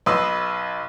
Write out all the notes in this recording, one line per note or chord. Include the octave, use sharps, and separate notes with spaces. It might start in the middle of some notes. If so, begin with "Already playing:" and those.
B1 B4 D#5 C6 E6